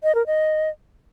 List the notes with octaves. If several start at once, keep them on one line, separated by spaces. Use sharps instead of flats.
D#5
A#4
D#5